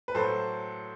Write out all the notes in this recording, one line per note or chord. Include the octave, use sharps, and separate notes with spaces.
B4
A2 F#3 A4 C5